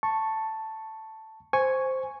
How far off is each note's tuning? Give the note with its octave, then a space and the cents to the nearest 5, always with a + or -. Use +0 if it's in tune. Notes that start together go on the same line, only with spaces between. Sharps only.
A5 +5 C#6 -10
C5 +0 G#5 +0 C#6 +0